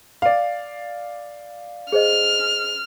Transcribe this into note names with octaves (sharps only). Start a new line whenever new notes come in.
D5 F5
G#4 C5 D#5 F6